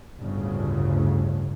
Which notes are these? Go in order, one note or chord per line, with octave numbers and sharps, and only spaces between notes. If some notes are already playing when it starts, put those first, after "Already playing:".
G1 D2 A2 C#3